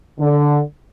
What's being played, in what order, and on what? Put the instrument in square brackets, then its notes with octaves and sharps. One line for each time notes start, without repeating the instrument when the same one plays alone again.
[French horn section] D3